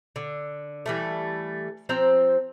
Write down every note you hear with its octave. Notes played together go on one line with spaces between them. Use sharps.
D3
E3 G3 A3
F3 C4 C5 A#5